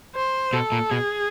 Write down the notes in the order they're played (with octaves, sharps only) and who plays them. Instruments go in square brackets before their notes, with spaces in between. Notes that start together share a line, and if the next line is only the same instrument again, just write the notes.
[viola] C5
[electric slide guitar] B2 [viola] A4
[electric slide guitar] A#2
[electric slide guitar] B2 [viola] G#4